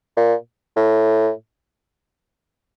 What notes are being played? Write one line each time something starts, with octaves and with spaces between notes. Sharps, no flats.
A#2
A2